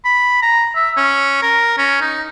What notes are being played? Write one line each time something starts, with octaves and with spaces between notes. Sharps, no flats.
B5
A#5
E5
C#4
A#4
C#4
D#4